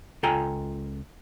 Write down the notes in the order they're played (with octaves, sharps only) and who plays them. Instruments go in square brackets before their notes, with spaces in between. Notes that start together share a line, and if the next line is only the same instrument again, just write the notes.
[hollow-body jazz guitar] C#2 F4 A4 G5 G#5 A#5